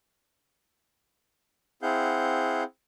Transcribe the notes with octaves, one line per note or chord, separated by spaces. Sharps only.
C4 E4 G#4 F5 F#5 G6